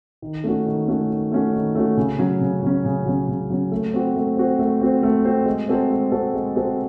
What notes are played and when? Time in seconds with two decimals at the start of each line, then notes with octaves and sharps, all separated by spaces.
0.22 D#3
0.44 A3 C#4 F#4
0.66 D#3
0.88 A3 C#4 F#4
1.09 D#3
1.32 A3 C#4 F#4
1.54 D#3
1.75 A3 C#4 F#4
1.97 C#3
2.18 F#3 C#4
2.41 C#3
2.63 F#3 C#4
2.85 C#3
3.05 F#3 C#4
3.28 C#3
3.50 F#3 C#4
3.72 A3
3.94 C4 F#4 C5
4.15 A3
4.37 C4 F#4 C5
4.59 A3
4.81 C4 F#4 C5
5.03 A3
5.25 C4 F#4 C5
5.46 G#3
5.69 C4 F#4 A4 C5
5.91 G#3
6.12 C4 F#4 A4 C5
6.34 G#3
6.55 C4 F#4 A4 C5